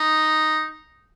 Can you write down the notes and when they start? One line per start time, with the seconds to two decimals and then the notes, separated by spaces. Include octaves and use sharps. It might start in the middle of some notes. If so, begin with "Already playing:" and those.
Already playing: D#4